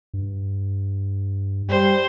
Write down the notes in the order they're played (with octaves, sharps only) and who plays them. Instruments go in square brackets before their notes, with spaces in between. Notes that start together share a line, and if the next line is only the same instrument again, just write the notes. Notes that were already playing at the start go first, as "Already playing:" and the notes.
[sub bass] G2
[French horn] G3 [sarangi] C5